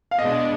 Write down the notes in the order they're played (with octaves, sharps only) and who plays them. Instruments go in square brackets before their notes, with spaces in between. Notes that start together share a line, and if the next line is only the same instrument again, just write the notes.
[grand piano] F5
[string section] B2 G#3 B3 D4 [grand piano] D#5